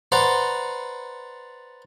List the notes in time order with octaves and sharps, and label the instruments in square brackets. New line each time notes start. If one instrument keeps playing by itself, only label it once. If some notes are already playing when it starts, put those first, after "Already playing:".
[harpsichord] B4 C5 D5 F#5 A#5 C#6